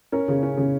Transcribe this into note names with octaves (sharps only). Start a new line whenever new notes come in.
C#4 A#4
C#3
C#4
C#3